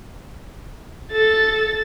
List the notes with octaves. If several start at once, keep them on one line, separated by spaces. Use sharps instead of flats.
A4 A6